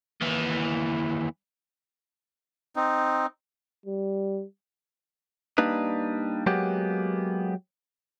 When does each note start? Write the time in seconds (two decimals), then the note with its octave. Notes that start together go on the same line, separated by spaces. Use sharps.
0.21 D#2 E3
2.76 C4 D#4
3.86 G3
5.58 G3 A#3 D4 D#4 B4
6.47 F#3 G#3 A#3 B3 G4